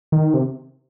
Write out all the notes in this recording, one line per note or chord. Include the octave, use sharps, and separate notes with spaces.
D#3
C3